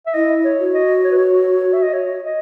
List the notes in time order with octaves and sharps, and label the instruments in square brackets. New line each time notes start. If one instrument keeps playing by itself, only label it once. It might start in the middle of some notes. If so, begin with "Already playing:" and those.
[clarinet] E5
[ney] E4 [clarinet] D#5
[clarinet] C#5
[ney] F#4
[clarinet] D#5
C#5
B4
C#5
E5
D#5
C#5
D#5